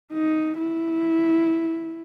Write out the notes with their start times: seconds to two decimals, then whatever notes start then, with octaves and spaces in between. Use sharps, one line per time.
0.13 D#4
0.58 E4